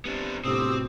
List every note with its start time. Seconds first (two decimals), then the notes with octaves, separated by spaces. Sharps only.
0.05 C3 B3 D4
0.45 G1 A2 C3 C4 G4 D#6 E6
0.67 B2